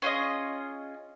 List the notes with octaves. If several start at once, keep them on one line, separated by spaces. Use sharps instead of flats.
C#4 F4 G#4 D#5